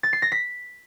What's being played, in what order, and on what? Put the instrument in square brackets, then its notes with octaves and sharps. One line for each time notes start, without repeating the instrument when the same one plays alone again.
[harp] A6
C7
A#6
B6